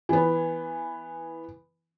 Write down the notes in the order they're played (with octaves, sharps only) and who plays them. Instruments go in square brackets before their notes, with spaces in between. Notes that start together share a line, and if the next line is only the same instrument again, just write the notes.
[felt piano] E3 B3